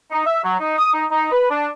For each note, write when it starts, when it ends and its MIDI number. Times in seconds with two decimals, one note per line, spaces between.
0.11 0.23 63
0.26 0.42 76
0.44 0.55 54
0.60 0.75 63
0.78 0.92 87
0.94 1.04 63
1.11 1.30 63
1.32 1.48 71
1.50 1.67 62